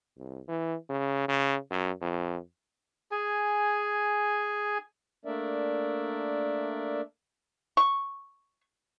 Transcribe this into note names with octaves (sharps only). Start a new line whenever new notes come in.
C2
E3
C#3
C#3
F#2
F2
G#4 G#5
A3 A#3 D4 A#4 D5 E5
C#6